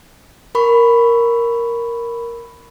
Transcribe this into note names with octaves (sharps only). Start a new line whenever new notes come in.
A#4 B5 C#6